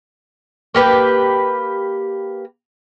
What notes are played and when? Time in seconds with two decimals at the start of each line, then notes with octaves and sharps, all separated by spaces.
0.75 A#3 G4 B4